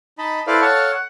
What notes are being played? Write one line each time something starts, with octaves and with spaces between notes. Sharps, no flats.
D#4 D#5 A5 B5
E4 A4 B4 C5 D5 F5
A4 C#5 F5 F#5 A5 C#6
F#5